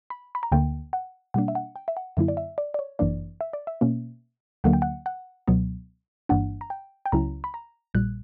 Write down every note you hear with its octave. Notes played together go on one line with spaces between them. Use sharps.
B5
B5
A#5
D2 D3 A#3 G5
F#5
B2 G3 A#3 D4 F#5
E5
F#5
G5
E5
F#5
F#2 D3 F#3 A#3 E4 E5
D5
E5
D5
D5
C#5
G1 F#2 E3 A#3 D4 D5
E5
D5
E5
B2 A#3 C#4
D2 D3 F#3 A#3 F#5
G5
F#5
F#5
C#2 B2 F#3 B3
G1 G2 E3 A#3 D4 F#5
A#5
G5
G5
C#2 C#3 F#3 C#4 E4 A#5
B5
A#5
A#1 A#2 G3 F#6